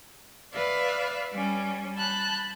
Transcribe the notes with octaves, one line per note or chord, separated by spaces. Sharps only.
B4 D5 E5 F5
G3 C#4
A5 B5 F#6 G6